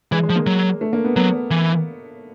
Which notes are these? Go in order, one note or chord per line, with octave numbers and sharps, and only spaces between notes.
E3 G#3
G#3
F3
A#3
F#3
A3
A#3
B3
F#3 B3
E3